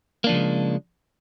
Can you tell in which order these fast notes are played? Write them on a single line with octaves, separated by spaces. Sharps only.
A#3 D4 F3 C#3 G#3